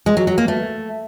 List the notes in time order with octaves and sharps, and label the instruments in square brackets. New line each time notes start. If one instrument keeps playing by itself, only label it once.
[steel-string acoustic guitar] G#3
F#3
F#3
A#3
A3